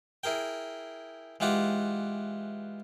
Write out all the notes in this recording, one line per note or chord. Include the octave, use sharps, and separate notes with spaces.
E4 G#4 A#4 G5
E3 G#3 F4 G4 F#5 D6